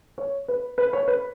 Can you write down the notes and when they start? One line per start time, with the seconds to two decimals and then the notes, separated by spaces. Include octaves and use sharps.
0.18 C#5
0.48 B4
0.78 B4
0.93 C#5
1.08 B4